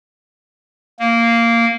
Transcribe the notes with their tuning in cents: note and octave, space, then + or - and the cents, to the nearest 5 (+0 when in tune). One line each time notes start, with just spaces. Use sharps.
A#3 -10